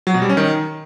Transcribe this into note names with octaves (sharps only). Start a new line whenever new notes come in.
F#3
B2
G3
C#4
D#3